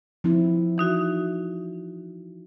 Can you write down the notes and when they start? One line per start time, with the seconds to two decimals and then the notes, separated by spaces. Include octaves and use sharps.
0.24 F3 C4 E4
0.78 E3 D#4 F#4